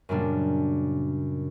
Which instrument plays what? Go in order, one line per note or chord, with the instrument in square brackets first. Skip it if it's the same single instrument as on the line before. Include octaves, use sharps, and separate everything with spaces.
[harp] F#2 A#2 C#3 G3 A#3 D4